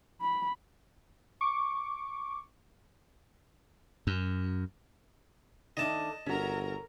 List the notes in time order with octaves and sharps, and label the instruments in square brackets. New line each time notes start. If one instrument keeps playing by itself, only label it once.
[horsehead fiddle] B5
[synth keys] C#6 D6
[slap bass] F#2
[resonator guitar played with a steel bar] D#3 A3 D4 [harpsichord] D#5 A5
[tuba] G1 [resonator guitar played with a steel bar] C#4 F#4 [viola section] A4 A#4 A#5